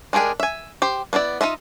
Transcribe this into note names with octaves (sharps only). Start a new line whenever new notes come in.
G#3 D4 G4 G#4 A#4
E5 G#5
G4 C5
B3 D4 E4 D5
D#4 F4 D#5 E5